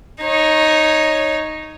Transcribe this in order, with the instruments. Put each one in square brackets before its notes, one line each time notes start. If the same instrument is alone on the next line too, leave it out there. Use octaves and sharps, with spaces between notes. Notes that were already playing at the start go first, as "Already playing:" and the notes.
[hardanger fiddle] D#4 C#5